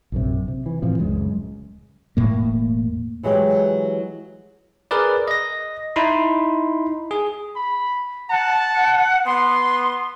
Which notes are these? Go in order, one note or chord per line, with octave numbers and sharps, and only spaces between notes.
A#1 F#2 C3
C3
E3
A2 E3 F3 C4
D1 C#2 F#2 G#3
E1 A2 A#3
E3 F#3 G#3 G4
G#4 A#4 B4 D5
D#5 A#6
D#4 E4 B5 C6
G#4
B5
F#5 A5
B3 C6